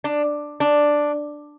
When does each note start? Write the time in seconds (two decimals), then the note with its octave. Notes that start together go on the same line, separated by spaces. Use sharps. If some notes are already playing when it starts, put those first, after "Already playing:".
0.04 D4
0.60 D4